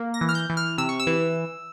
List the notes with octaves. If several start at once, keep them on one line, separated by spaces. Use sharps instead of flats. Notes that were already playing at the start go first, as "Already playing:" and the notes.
Already playing: A#3
A#6
E3
F6
G6
E3
F6
C3 E6
C#6
E6
E3